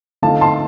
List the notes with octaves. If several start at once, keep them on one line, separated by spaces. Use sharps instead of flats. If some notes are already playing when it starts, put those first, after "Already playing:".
D3 F3 A3 C4 D#4 F5 A5
A5 C6